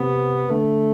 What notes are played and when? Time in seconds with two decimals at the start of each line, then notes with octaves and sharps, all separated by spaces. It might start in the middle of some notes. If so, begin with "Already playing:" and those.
Already playing: C3 B3
0.50 D3 A3